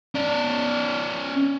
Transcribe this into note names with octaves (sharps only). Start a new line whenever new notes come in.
C#4 D5